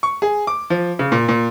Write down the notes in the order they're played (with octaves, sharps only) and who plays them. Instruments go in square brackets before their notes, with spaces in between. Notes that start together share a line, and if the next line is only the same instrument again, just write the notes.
[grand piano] C#6
G#4
D6
F3
C#3
A#2
A#2